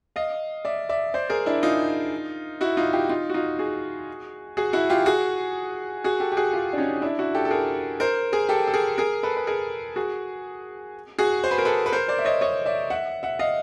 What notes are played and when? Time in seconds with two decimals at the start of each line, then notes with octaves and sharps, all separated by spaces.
0.16 D#5 F5
0.65 D5 E5
0.89 D5 E5
1.14 C5 D5
1.30 G#4 A#4
1.46 D4 E4
1.63 D#4 F4
2.61 E4 F#4
2.77 D#4 F4
2.93 F4 G4
3.09 D#4 F4
3.30 F#4
3.34 D#4 F4
3.59 F#4 G#4
4.57 F#4 G#4
4.73 E4 F#4
4.90 F4 G4
5.06 F#4 G#4
6.04 F#4 G#4
6.20 G4 A4
6.32 G4
6.37 F#4 G#4
6.53 F4 G4
6.73 D4
6.78 C#4 D#4
7.02 D4 E4
7.19 E4 F#4
7.35 G4 A4
7.45 A4
7.51 G#4 A#4
8.00 A#4 C5
8.33 G#4 A#4
8.49 G4 A4
8.67 A4
8.74 G#4 A#4
8.98 G#4 A#4
9.23 A4 B4
9.37 B4
9.47 G#4 A#4
9.96 F#4 G#4
11.19 F#4 G#4
11.44 C5
11.51 B4
11.58 A#4
11.65 A4 B4
11.86 B4
11.92 A#4 C5
12.08 C5 D5
12.19 E5
12.25 C#5 D#5
12.41 C#5 D#5
12.66 D5 E5
12.90 E5 F#5
13.23 E5 F#5
13.39 D#5 F5